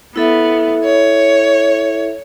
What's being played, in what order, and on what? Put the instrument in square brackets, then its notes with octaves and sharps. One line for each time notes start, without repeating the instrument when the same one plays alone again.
[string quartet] B3 [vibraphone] E4 A4 E5
[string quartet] C#5